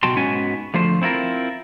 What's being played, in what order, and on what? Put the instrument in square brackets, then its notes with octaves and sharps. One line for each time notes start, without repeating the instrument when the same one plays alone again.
[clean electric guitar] B2 F#3 F#4 G5 A5 C6
G#2 B3 C#4 F#4 G#5
D3 F3 A3 C5
C4 E4 F4 A#4